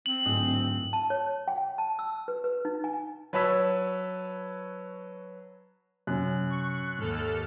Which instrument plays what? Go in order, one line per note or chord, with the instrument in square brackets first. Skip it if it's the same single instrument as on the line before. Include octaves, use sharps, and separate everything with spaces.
[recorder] C4 [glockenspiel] F#7
[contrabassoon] D1 [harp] G#2 D#6 F#6
[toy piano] A5
C#5
G5
A5
E6
B4
B4
D#4
G#5
[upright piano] F#3 B4 C#5 A5 E6 B6
[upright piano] F#2 [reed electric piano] C3 C#4 [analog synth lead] F#6
[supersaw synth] C#6
[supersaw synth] D#2 A4 F6 [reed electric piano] G#2